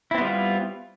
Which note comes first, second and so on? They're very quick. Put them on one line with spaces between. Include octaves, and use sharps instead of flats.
E4 C4 B3 G3 F4